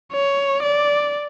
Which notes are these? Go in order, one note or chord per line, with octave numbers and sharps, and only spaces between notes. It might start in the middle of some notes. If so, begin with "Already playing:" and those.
C#5
D5